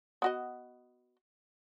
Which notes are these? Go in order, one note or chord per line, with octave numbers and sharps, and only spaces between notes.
B3 F#4 D#5